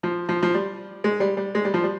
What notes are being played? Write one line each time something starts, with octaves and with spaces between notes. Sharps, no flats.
F3
F3
F3
G3
G#3
G3
G3
G#3
G3
F3
G3